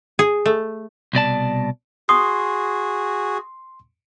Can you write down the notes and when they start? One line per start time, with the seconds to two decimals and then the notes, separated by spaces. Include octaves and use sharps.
0.19 G#4
0.46 A3
1.13 C2 B2 D5 A5
2.09 F#4 G#4 C6 D#6